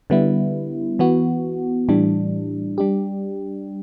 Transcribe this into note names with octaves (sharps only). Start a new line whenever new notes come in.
D3 G3 B3 E4
E3 B3 F#4
A2 E3 G3 D4
G3 D4 G4